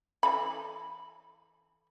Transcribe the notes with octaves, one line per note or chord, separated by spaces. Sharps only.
E3 A4 B5